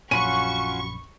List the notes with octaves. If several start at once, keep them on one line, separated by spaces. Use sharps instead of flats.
A#1 F#2 C#4 F4 F#4 B5 C#6 D#7